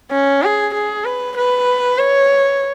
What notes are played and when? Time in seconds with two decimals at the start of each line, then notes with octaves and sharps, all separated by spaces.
0.11 C#4
0.43 G#4
0.74 G#4
1.05 B4
1.36 B4
1.99 C#5